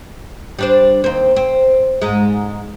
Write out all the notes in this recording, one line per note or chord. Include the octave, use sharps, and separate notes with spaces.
G3 D4 C5
D#2 C4
C4
G#2 G#3